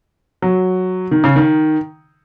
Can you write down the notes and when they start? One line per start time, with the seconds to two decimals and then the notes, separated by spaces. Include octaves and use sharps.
0.42 F#3
1.11 D#3
1.24 C#3
1.36 D#3